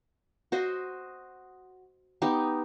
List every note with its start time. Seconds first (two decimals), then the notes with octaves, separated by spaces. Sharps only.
0.52 F#4 C5 D#5
2.22 B3 D#4 G4